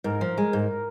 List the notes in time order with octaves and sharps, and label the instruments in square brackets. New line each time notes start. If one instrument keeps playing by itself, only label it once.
[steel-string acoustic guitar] G#2 [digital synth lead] A#4
[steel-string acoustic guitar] F3
G#3
G#2